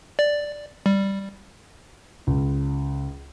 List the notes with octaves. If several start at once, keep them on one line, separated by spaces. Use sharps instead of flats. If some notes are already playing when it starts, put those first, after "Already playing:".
D5
G3
C#2